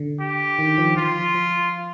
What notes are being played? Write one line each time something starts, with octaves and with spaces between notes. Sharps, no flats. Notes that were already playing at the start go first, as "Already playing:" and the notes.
Already playing: D3
G4
D#3
F3
F3 F4
F3